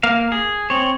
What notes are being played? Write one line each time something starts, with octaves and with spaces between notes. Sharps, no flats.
A#3 A#4 F5
G#4
C4 C#5